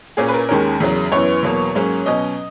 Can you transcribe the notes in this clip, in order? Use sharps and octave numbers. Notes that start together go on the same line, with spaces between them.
A#2 A#3 C#4 G#4
B4
A#4
D#2 D#3 G#3 C#4 A#4
E2 C#3 F#3
F#2 E3 B3 C#5
E2 B2 F#3 A#3
G#2 F#3 A#3 C#4
B2 F#3 C#4 D#5